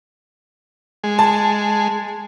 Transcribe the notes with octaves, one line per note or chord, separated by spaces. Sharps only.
G#3
A5